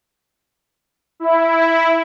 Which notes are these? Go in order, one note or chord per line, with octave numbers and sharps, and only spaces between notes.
E4